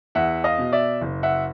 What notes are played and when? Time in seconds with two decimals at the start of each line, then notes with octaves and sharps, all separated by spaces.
0.15 E2 E5 F#5
0.44 D#5 F5
0.58 B2
0.72 D5 E5
1.02 F#1
1.23 E5 F#5